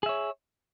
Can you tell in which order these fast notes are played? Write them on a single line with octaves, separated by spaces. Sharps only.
G#4 E5 C#5